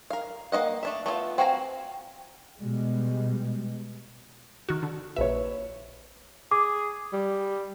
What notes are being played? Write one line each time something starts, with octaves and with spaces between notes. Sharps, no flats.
A#4 F5
A#3 E4 D#5 F#5
A3 D4 E5
A3 B3 E4 F4
C4 F#4 F5 G#5 A#5
B2 G3 G#3
D#3 F#4
D3
A#1 B4 C#5 E5
G#4 D6
G3